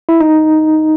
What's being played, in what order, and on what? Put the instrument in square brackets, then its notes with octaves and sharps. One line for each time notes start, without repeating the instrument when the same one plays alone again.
[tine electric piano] E4
D#4